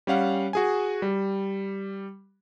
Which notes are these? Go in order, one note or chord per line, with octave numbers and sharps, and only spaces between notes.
G3 C#4 F5 F#5
F#4 G#4 G#5
G3